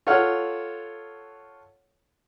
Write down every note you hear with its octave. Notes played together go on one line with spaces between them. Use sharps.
F4 A4 C#5 F#5 F6